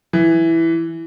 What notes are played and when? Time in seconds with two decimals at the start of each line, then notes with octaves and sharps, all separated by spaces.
0.13 E3